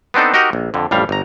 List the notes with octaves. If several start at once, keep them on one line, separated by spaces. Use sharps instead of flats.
B3 C4 D4 D#4 A4
D#4 F#4 G4 A#4 D#5
A#1
F2 D3
A1 F2 G3 F5
G1 A#5